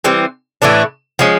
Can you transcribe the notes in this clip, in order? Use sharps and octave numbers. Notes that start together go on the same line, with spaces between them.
E3 G3 C4
A2 E3 A3 D4
F3 G#3 C#4